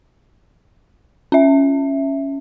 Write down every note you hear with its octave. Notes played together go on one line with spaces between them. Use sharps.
C#4 E5